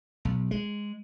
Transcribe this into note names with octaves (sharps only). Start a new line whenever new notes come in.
B1
G#3